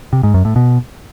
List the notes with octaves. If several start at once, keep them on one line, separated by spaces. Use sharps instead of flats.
C3
G#2
F#2
A2
B2